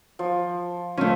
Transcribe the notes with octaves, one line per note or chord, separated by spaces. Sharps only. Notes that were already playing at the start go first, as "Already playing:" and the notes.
F3
A3 C#4 F4